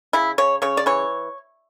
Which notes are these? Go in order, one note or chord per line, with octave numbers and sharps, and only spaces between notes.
C#3 E4
C#3 C#5
C#3 C#5
D5
E3 C#5